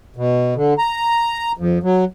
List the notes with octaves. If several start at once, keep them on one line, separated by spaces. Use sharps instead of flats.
B2
D3
A#5
F2
F#3